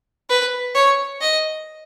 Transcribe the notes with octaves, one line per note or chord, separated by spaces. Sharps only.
B4
C#5
D#5